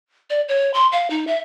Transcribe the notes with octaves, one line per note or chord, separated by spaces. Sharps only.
D5
C#5
C6
F5
D#4
E5